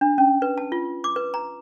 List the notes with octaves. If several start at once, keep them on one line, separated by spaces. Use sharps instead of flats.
D4
C#4
B4
A5
F4
D6
B4
A#5